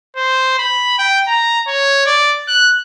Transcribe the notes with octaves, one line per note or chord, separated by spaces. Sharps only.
C5
B5
G5
A#5
C#5
D5
F#6